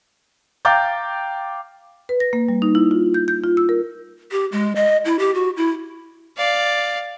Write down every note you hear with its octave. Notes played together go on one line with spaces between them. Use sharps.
F5 G5 A#5 D6 G6 A6
B4
A#6
A#3
G3
D#4
E4
F4
G6
G6
F4
E6
A#4
G4
G#3
D#5
E4
G4
F#4
E4
D5 F5